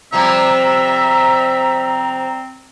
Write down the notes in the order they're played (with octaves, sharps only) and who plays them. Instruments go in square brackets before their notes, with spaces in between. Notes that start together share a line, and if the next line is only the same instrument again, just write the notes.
[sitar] C3 F3 G3 [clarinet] C4 [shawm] E5 [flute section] A#5